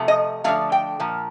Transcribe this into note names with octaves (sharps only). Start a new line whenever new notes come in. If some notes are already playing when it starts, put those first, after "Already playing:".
Already playing: C3 F3 A3
D#5
D3 F3 A3 F5
G5
A#2 F3